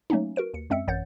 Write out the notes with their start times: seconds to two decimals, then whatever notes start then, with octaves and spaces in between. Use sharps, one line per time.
0.10 F#3 A3 A#3 C#4 D#4
0.36 F#4 A#4 B4 D7
0.54 D#2 C#7
0.70 F#2 G#3 C4 E5 E6 C#7
0.88 A1 F#2 C#5 F#5 G6 A6